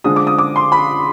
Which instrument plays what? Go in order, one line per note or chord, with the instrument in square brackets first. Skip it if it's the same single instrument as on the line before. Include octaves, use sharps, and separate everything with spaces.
[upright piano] D3 F3 G#3 D4 D#6
D6
D#6
D6
C6
B5